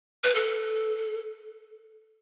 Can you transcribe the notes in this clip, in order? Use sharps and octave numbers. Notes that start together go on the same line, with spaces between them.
B4
A4